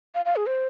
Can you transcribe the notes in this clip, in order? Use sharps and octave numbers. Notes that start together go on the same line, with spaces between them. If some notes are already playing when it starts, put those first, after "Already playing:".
F5
F5
G#4
C5